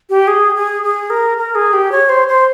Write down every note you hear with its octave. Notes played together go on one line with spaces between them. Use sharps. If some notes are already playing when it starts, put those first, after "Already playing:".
G4
G#4
G#4
G#4
A#4
A#4
G#4
G4
C#5
C5
C5